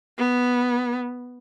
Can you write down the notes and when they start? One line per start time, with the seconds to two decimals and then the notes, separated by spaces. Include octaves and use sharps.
0.18 B3